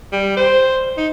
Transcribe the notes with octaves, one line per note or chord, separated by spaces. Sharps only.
G3
C5
D#4